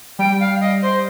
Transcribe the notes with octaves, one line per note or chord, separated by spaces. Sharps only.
G3 G5
F5
D#5
C5